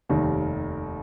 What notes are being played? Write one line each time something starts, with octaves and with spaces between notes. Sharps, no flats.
F1 D#2 D#3 G3